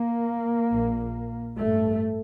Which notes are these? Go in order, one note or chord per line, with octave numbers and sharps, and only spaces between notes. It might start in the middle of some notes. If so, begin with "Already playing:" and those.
Already playing: A#3
A#1 A#2
A1 G2 A3